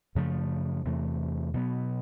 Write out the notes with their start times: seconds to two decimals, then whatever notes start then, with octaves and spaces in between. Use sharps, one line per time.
0.15 F#2 C#3 F3 A3
0.85 E2 C3 E3 A3
1.54 B2 F#3 B3